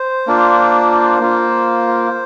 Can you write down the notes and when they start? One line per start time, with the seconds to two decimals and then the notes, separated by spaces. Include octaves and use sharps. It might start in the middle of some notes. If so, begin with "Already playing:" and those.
Already playing: C5
0.27 A#3 D4 F4
1.20 A#3 F4